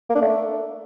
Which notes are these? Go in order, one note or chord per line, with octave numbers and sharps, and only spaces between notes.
A#3
D4
A3